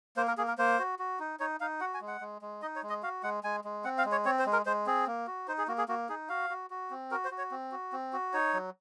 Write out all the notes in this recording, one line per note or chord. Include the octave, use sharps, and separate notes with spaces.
A#3 C5
A#4
A#3 G#4
A#4
A#3 C5
F#4
F#4
D#4
D#4 C#5
D#4 F5
F#4 F#5
G#5
G#3
F#5
G#3
G#3
D#4 D#5
C#5
G#3
D#5
F#4 F5
G#3 F#5
G#3 G#5
G#3
C4 F#5
F5
G#3
C#5
C4 C#5
C5
G#3
A#4
G#3 C5
C4 G#4
A#3
F#4
D#4 C5
G#4
A#3 F#4
G#4
A#3 F#4
D#4 G#4
F#4 F5
F#4
F#4
C4
F#4 A#4
C5
F#4
C#5
C4
F#4
C4
F#4
D#4 C#5
F#3